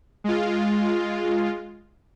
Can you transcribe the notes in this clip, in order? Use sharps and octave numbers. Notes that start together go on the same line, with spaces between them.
G#3 F4